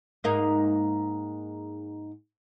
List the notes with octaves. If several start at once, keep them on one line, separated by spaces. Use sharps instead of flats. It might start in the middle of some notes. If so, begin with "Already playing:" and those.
G#2 A#3 D#4